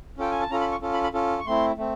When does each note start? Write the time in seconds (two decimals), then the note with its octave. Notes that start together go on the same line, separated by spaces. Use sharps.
0.18 C#4 F4 A4 G5
0.31 G#5
0.41 A5
0.50 C#4 F4 A4 A#5
0.61 B5
0.72 C#6
0.82 C#4 F4 A4
0.94 B5
1.04 B5
1.14 C#4 F4 A4
1.40 C#6
1.46 A3 C4 E4 C6
1.78 A3 C4